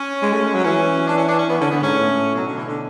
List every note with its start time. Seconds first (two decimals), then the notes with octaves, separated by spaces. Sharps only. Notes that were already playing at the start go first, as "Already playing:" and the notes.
Already playing: C#4
0.22 G#3
0.33 A3
0.44 G#3
0.54 F#3
0.65 E3 C#4
1.07 D4
1.18 C#4
1.29 D4
1.39 C#4
1.49 E3 B3
1.60 D3 C#4
1.71 D3 B3
1.82 G#2 C#4
1.92 A2
2.35 B2 F#3
2.46 D3
2.57 E3
2.67 D3